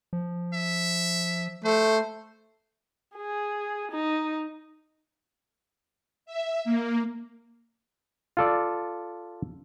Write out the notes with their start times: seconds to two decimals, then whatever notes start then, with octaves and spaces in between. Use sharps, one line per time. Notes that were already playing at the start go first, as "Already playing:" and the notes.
0.13 F3
0.54 E5
1.64 A3 C5
3.16 G#4
3.91 D#4
6.26 E5
6.65 A#3
8.37 F4 A4 D5